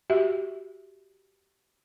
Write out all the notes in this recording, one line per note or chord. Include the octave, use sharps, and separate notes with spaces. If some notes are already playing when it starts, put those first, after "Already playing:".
F#4 G4 E5